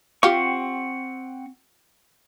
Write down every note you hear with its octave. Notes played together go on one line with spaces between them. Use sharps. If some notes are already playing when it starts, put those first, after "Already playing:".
C4 F4 G4 F#5 C#6